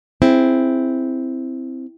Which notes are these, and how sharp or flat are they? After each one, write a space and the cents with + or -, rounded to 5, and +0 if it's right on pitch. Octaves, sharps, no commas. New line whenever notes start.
C4 +0 E4 +0 G#4 +0